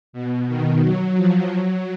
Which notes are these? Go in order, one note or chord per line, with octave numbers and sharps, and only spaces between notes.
B2
D#3
F#3
F3
F#3